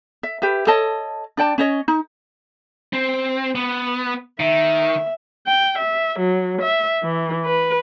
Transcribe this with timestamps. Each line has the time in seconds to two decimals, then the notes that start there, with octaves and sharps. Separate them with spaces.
0.23 E5
0.42 G4 B4 E5
0.67 A4 C#5 D#5 A5
1.37 D4 D5 G5 A5
1.58 C#4 C#5 D#5
1.88 D#4
2.93 C4
3.55 B3
4.40 D#3 E5
5.46 G5
5.78 E5
6.19 F#3
6.61 E5
7.03 E3
7.46 B4